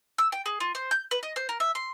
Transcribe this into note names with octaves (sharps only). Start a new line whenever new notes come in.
E6
G5
G#4
F4
C5
G6
B4
D#5
C5
A#4
E5
C6